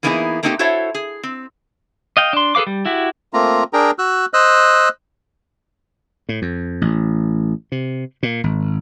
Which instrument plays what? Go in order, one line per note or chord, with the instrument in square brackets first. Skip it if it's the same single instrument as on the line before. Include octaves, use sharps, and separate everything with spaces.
[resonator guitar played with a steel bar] E3 A#3 B3 D#4 E4 G#4
A3 A#3 C4 D#4 F4 G4
E4 F#4 A4 C5 C#5 E5
G#4
C4
[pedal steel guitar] D#5 F5 G5
D4 C6
G#4 A4 B4 F5 D6
G3
E4 F#4 G4
[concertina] A3 A#3 C4 F4 A#5
D4 G#4 A#4 G5 A#5
F#4 E6 F#6
C5 D#5 E6 F#6
[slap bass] A2
F2
A1
C3
A#2
G#1